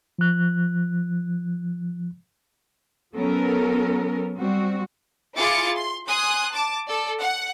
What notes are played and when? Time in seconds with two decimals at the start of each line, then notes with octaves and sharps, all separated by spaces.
0.19 F3 F#6
3.15 F#3 B3 C#4 A4 A#4
4.36 G3 C4 F#4
5.36 E4 F4 G#4 D6 A6 C#7
5.76 C6
6.07 G#5 C6 D#6 F#6
6.51 A5 D6
6.87 A4 D5
7.20 F#5